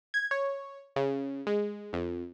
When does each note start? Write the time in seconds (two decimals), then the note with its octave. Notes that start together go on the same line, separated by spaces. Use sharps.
0.14 G#6
0.31 C#5
0.96 C#3
1.47 G#3
1.93 F2